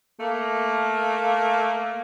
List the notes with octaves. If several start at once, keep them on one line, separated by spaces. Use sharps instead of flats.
A3 A#3